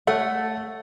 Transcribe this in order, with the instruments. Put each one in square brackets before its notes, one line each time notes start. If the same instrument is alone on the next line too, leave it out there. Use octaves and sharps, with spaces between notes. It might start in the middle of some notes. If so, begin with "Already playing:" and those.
[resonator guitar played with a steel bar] A3 [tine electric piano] A4 C#5 [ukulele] F#5